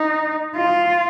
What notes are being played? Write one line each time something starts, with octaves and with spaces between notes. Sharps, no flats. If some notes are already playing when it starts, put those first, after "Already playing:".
Already playing: D#4
F4